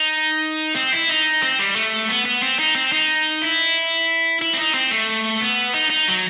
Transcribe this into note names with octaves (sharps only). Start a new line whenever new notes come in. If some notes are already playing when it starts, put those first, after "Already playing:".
Already playing: D#4
C4
E4
D#4
C4
G3
A3
B3
B3
C4
D#4
C4
D#4
E4
E4
C4
D#4
C4
A3
B3
D#4
D#4
F#3